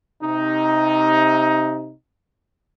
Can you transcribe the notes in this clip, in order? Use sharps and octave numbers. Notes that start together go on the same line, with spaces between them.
C3 D#4